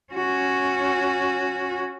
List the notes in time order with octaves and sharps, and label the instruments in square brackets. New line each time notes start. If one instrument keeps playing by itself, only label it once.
[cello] C#4 F#4